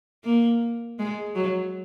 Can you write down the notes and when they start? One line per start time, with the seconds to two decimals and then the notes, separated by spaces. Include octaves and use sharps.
0.24 A#3
0.99 G#3
1.35 F#3